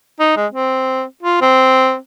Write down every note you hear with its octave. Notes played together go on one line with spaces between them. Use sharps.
D#4
G#3
C4
F4
C4